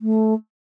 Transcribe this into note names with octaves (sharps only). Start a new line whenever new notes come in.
A3